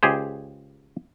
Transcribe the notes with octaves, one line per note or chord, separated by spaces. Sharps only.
C#2 G4 G#4 C5